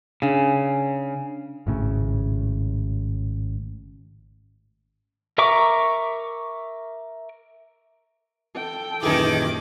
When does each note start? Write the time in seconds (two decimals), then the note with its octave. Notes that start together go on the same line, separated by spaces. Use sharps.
0.22 C#3 D4 G#5
1.67 G#1 A2 C#3
5.38 A#4 E5 A#5 C#6 D6
8.56 A4 G5
9.03 D#1 F#2 D#3 E3 G#4 D6